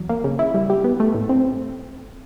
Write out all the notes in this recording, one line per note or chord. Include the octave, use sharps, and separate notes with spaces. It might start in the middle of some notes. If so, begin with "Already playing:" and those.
Already playing: E2 F#3
A#3
C#3
E4
G3
G4
B3
A3
A2
C4